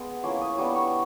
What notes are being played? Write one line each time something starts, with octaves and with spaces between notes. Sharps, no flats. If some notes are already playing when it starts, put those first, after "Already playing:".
Already playing: G#3 B3
F3 A#3 C#4 E4 D6
D#6
G3 B3 D4 D6
C#6